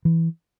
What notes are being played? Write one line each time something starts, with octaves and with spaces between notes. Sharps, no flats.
E3